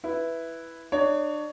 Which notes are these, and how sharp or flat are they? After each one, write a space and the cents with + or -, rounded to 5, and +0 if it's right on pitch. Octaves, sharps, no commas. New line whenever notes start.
E4 +0 B4 +0
D4 +35 C#5 +20